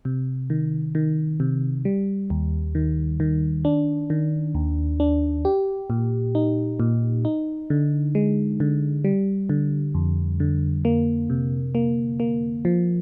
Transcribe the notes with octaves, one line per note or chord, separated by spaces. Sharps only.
C3
D#3
D#3
C3
G3
D#2
D#3
D#3
D4
D#3
D#2
D4
G4
A#2
D#4
A#2
D#4
D3
G#3
D3
G3
D3
F2
D3
A#3
C3
A#3
A#3
F3